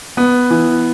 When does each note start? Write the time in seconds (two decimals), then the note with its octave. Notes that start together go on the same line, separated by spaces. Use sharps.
0.17 B3
0.50 E3